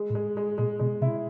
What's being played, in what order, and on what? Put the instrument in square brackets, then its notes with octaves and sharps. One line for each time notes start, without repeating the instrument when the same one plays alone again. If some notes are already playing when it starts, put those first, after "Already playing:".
Already playing: [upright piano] G#3
[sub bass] A2
[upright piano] G#3
G#3
[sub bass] A#2 [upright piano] G#3
[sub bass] B2 [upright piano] G#3
[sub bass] C3 [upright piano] E4